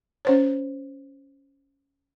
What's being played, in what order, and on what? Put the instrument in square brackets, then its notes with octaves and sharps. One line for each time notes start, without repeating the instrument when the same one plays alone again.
[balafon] C#4 C5 C#5